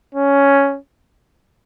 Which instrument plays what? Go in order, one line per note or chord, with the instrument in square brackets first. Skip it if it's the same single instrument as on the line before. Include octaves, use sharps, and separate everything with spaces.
[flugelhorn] C#4